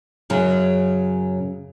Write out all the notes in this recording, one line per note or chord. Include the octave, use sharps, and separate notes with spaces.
F#2 C#3 F#3